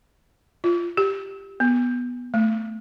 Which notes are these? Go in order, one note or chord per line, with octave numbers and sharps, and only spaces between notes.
F4
G4
B3
A3